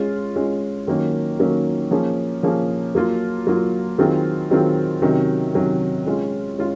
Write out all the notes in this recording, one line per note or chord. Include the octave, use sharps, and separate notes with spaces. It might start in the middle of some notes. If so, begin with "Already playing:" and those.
Already playing: G#3 C#4 F4 G#4
G#3 C#4 F4 G#4
D#3 F#3 A#3 C#4
D#3 F#3 A#3 C#4
F3 A#3 C#4 G#4
F3 A#3 C#4 G#4
F#3 A#3 F4
F#3 A#3 F4
D#3 F#3 C4 F4 G#4
D#3 F#3 C4 F4 G#4
C3 D#3 F#3 C#4
C3 D#3 F#3 C#4
G#3 C#4 F4
G#3 C#4 F4